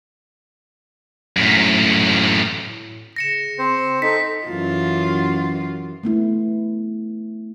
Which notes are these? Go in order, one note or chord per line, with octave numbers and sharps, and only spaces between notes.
F#2 A2
A2
C#3 A#6 C#7 E7
C4 C5
D#4 A4 B6
F#2 E3 F4
A3 B3 E4